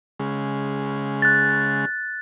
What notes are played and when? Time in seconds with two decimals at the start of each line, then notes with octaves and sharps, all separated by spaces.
0.20 C#3 G#3
1.22 F#6 A6